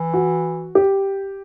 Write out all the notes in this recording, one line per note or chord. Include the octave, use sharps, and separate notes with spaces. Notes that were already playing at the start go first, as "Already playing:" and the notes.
Already playing: E3
F#4
G4